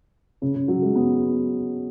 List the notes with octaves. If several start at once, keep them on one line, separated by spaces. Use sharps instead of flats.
C#3
C#3
F#3
G#3
B3